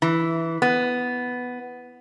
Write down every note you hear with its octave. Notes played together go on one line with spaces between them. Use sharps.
E3
B3